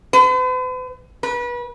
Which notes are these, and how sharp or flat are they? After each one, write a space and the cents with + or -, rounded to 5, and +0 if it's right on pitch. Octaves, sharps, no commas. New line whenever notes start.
B4 +45
B4 -30